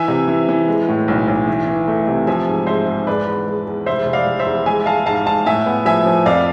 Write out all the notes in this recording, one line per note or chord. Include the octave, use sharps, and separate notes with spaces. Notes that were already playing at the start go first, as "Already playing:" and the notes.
Already playing: E3 E5 G#5
C3
E3
E3
G#3
A2
B1
B1
E3
E3
A3
C3
F3 E5 G#5
G#2
G#3 C5 E5
G#2
G#3 B4 D5
E2
G#3
E2
F1 C5 E5
F1
D5 F5
F1
C5 E5
E2
G#3 E5 G#5
G#3 F5 A5
G#2 F5 A5
G#2 F5 A5
A2 E5 G#5
B3
F3 E5 G#5
F3
F2 D5 F5